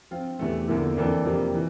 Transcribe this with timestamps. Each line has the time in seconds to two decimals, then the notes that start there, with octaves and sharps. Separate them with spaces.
0.11 F3 C4 F4
0.39 E2 C3 E3 A3
0.68 E2 D3 F3 A#3 E4
0.97 F2 E3 A#3 D4 A4
1.25 F2 C3 F3 A#3 D4
1.54 E3